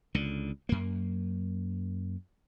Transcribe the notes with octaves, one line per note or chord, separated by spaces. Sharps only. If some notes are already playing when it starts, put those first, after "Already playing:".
C#2 D3
F#2 A#3